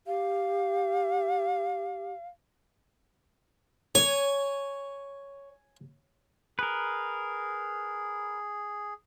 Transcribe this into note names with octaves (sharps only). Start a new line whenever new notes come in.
G4 F5
C#5 G#5
G#4 A#4 B4